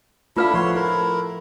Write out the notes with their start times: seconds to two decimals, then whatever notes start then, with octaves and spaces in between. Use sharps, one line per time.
0.37 A3 D4 E4 F4 A4 B4 F5
0.54 F3 A3 C#5 F#5 C6
0.75 E4 A4 A#4